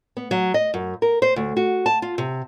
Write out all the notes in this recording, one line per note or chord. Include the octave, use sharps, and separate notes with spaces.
B3
F#3
D#5
F#2
A#4
C5
D2
F#4
A5
F4
C3